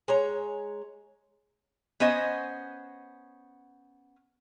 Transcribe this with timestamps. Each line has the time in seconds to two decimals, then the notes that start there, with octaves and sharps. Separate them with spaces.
0.08 G#3 C#5 A#5
2.00 B3 C#4 C5 D#5